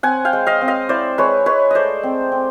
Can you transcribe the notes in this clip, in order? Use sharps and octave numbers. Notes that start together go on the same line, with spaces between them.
C4 F#5 G#5
F5 G5
G#3
D#5 F5
C4
D#5 F5
E4 C5 D5
G#3 B4 C#5
G#3 B4 C#5
A3 C5 D5 D#5
C4
C4